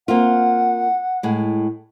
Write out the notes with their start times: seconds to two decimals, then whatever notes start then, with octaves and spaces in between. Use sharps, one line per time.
0.08 A#3 C4 F4 F#5
1.23 A2 G#3